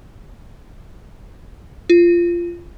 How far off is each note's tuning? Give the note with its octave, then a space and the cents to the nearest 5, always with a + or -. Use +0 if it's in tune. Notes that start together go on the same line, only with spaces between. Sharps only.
F4 -15